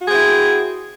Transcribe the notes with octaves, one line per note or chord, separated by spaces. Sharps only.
C4 E4 F#4 G#4